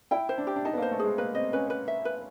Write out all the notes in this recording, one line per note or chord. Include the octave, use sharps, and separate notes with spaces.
E4 G5
C5
D4
G4
D4
D#4 A5
B3
A#3 C5
A3
G#3 G#4
A#3 B4
C4 D#5
C#4 B4
B4
E5
B4